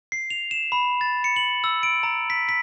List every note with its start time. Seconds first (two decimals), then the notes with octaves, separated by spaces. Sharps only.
0.12 C7
0.30 F7
0.51 E7
0.72 B5
1.01 A6
1.24 C#7
1.36 F#7
1.64 E6
1.83 D7
2.03 A#5
2.30 B6
2.49 B6